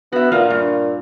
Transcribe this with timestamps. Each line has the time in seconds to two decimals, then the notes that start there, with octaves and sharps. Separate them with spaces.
0.12 B3 F#4 E5
0.32 A#2 A#3 F4
0.50 G2